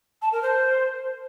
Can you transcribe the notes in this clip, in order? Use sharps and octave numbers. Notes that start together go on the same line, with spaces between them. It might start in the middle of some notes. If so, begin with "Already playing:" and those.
A5
A#4
C5